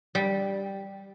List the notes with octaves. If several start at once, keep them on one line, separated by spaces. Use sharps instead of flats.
G3